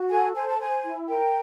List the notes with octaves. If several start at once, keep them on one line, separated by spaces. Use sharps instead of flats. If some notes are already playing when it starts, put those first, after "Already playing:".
Already playing: F#4
A4 G#5
C5 G#5
A5
C5 G#5
E4
A#4 G5